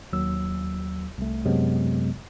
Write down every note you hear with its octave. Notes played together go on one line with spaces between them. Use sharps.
D#2 F#3 E6
C2 A3
F#2 C3 F#3 G#3 B3